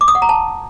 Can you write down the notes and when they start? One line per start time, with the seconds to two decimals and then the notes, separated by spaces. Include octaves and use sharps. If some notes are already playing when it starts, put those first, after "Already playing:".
0.01 D6
0.08 D#6
0.15 F#5
0.22 A#5
0.29 A5